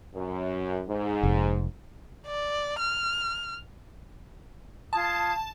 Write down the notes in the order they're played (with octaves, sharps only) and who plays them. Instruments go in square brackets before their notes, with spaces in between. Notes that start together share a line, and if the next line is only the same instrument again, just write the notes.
[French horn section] F#2
G#2
[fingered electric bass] F1
[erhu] D5
F6
[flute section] F4 D#6 G#6 [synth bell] A5